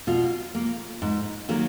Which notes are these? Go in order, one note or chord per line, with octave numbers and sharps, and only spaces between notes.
B2 F4
A#3
G#2
D#3 F#3 A#3